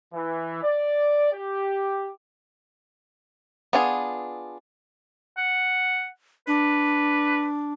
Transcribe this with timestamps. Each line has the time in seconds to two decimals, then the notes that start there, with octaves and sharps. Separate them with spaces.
0.14 E3
0.63 D5
1.32 G4
3.73 B3 D4 F4 G#4
5.38 F#5
6.47 D4 B4